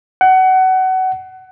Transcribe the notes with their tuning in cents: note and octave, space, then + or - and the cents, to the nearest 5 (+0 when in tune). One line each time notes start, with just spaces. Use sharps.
F#5 +25